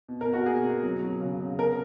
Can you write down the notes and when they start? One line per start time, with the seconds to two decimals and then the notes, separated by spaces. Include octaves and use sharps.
0.08 B2
0.21 A#4
0.27 B2
0.33 F#4
0.46 A#3 G#4
0.65 B2
0.83 F#3
1.03 F#3
1.21 C#3
1.40 C#3
1.59 B3 A#4